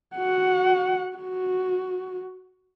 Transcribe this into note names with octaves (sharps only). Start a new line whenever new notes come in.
F#4 F#5
F#4